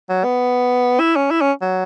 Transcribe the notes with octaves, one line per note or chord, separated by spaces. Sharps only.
F#3
B3
E4
C#4
E4
C#4
F#3